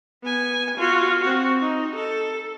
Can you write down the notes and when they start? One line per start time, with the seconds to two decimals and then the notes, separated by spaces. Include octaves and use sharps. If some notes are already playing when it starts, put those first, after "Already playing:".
0.23 B3 G#5
0.78 F4 F#4
1.22 C4 F#4
1.61 D#4
1.95 A4